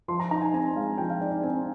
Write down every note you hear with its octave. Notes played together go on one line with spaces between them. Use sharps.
F3 C6
A#5
D#4 A#5
G#5
C4 G#5
G#3 F5
F3 G5
F5
D#4 D5
D5
C4 G#5